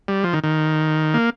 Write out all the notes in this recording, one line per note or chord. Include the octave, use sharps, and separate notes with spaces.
G3
F3
D#3
D#3
A#3